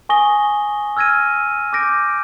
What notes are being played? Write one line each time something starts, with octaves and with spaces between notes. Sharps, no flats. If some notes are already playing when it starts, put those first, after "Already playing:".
G#5 C#6 D#6 A#6 G7
E6 F6 G#6 A#6 D#7
D6 G6 A#6 D7